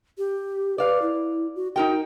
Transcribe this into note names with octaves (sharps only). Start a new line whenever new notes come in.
G4
B4 D5 F5
E4
F#4
D#4 F#4 A#4 G5